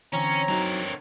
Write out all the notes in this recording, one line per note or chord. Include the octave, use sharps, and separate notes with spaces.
D3 E3 C4 C#4 C#5 A#5
D3 F#3 D#4 F#4 A#4